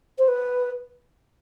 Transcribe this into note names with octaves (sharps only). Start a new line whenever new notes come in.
C5
B4